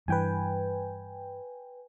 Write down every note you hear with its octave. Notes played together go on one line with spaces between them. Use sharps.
G2 E3 B4 G5 G#5